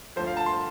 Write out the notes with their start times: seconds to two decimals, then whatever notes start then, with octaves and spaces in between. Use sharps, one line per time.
0.16 D2 D3 F3 C5
0.27 F5
0.37 A5
0.46 C6